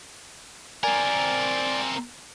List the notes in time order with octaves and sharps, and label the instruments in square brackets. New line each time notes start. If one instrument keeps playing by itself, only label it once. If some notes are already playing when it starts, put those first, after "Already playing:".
[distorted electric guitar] C4 A#4 [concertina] D5 [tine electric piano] G#5